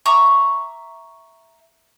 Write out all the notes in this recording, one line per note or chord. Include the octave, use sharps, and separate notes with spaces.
E5 A#5 C#6 D6